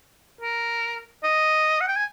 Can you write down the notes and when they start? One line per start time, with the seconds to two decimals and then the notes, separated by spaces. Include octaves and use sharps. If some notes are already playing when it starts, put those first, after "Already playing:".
0.41 A#4
1.24 D#5
1.81 F#5
1.88 G5
1.96 G#5